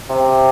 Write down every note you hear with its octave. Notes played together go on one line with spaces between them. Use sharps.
C3